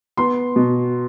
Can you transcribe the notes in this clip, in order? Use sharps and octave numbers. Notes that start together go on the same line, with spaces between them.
B3 C6
B2